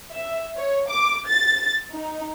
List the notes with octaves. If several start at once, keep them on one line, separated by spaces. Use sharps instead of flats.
E5
C#5
D6
A6
D#4